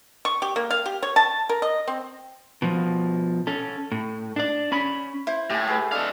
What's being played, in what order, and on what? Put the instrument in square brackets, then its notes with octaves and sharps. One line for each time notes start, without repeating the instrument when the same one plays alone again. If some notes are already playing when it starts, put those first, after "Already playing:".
[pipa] C#6
G4
A#3
F5
G4
C#5
A5
A#4
D#5
C4
[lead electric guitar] B2 F3
C#4 A4
A2
D4 D5
C#4 B5
[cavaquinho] E4 [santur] C5
[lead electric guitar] A2 [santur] G4 G#5
[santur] G#4 A4 B4
[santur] G#3 A3 D4 [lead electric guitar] A4 F5